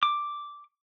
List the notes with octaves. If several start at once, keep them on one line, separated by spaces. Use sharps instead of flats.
D6